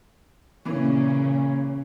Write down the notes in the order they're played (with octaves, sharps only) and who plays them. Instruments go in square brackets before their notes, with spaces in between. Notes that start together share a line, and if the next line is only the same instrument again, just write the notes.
[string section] A#2 C#3 C#4 [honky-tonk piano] E3 A#3